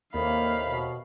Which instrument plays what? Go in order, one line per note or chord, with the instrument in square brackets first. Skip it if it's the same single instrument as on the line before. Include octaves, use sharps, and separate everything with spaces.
[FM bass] D#2 [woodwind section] A2 C3 D#3 [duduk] A#3 [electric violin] F5 B5
[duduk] B2